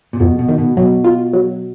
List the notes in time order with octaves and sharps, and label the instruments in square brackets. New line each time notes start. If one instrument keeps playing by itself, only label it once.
[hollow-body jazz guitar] A#2
[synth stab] F2 [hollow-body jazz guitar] B2
[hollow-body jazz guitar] B2
[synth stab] D#3
[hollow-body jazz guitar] B2
[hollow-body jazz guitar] B2 [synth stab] F#3
[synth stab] F4
F#3